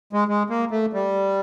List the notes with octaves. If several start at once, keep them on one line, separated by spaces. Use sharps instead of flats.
G#3
G#3
A#3
A3
G3